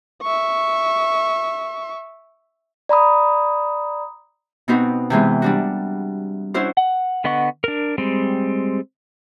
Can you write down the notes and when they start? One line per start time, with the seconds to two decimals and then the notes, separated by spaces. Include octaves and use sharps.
0.22 E5 C#6
2.89 D5 A#5 B5 D#6
4.68 B2 B3 C4 D#4 F#4 B4
5.10 C3 E3 G#3 B3
5.42 G3 D4 F#4
6.54 C#4 D4 E4 F#4 C5
6.77 F#5
7.24 D3 B3 D#5 F#5 C#6
7.64 D4 A#4
7.98 G3 G#3 C4